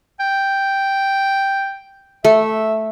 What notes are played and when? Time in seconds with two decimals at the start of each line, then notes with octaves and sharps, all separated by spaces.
0.20 G5
2.24 A3 E5